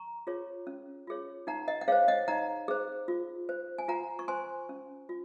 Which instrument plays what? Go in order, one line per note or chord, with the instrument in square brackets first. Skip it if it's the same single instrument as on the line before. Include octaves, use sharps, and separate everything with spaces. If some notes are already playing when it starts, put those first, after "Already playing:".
Already playing: [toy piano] A#5 C#6
F4 G#4 C#5
C#4
F4 G#4 C#5
D#4 F#5 A#5
D#5 F#5
F#5
G#4 C5 C#5 F5
D#5 F#5
D#4 F#5 A#5
G#4 C5
F4
C5
G#5
F4 F#5 A#5
C#6
C5 G#5 C6
C#4
F4